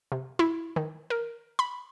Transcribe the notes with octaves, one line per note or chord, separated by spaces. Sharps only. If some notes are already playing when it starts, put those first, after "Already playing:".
C3
E4
D#3
A#4
B5